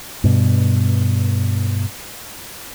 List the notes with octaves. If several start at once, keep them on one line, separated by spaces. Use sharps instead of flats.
G2 B2